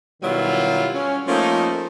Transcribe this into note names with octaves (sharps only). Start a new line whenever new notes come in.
B2 D#3 F#3 G3 E4 F4
C#4
F3 A3 A#3 C#4 D#4